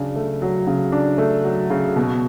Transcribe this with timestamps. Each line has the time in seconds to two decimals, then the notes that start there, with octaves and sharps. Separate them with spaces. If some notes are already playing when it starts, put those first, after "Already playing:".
Already playing: C#3 F#3 D4
0.16 A3
0.42 F#3
0.67 C#3
0.92 D4
1.18 A3
1.44 F#3
1.70 C#3
1.96 B2